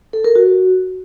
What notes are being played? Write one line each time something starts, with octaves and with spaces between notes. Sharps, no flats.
A4
A#4
F#4